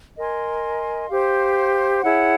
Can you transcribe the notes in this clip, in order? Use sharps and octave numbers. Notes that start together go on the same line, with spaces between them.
A#4 D#5 G#5 C6
G4 C5 F5
E4 G#4 C#5 F#5